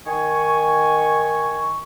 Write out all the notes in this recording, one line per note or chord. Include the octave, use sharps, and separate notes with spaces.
D#3 G#5 C#6